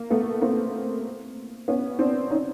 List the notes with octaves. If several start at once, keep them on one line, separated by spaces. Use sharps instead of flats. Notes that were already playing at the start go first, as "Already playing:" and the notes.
Already playing: A#3
A3 B3
A#3 C4
B3 C#4
C4 D4
C#4 D#4